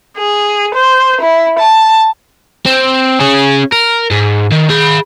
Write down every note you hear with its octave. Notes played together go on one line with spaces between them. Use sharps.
G#4
C5
E4
A5
C4
C#4 G#4
A#4
G#2
D#3
G#4 B5